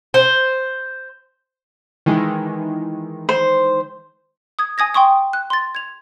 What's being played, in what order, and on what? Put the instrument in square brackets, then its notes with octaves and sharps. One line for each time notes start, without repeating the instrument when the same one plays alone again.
[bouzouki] C5
[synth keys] D#3 E3 G#3
[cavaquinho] C5
[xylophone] D#6 G#6
G#5 D#6 G#6 A#6
G5 C6 C#6 D#6
F#6
C6 A6
G#6 F7